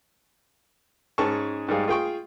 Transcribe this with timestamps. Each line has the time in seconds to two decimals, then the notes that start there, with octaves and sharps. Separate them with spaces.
1.18 G#2 C#4 G#4 A5 C#6
1.68 G#2 G3 G#4 F5
1.88 F4 G#4 G5 C#6